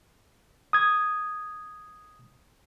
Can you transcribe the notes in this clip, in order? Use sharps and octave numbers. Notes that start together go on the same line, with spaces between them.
D#6 G#6